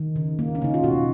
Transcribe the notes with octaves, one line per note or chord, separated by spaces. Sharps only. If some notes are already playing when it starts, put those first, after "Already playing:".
Already playing: D#3
C#3
A#3
C#4
C#3 D#4
F4
B2 F#4